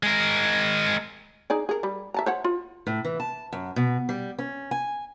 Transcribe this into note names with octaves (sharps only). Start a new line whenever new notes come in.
G#3 A#4
D#4 G#4 D5
G#4 A#4
G3
E5 A5 A#5
C5 C#5 F#5
F4
A2
E3
A5
F#2
B2
G3
C#4
G#5